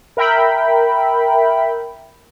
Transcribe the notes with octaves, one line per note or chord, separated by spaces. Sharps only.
A#4 E5 G5 B5